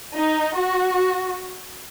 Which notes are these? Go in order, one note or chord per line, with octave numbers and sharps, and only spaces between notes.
D#4
F#4